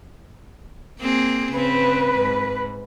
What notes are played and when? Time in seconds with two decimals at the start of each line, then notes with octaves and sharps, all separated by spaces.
1.00 A#3 C4 G#4
1.53 C#3 C4 B4
2.19 G#2